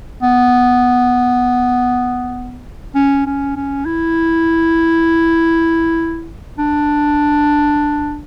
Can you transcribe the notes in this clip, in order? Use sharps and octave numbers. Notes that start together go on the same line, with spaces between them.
B3
C#4
C#4
C#4
E4
D4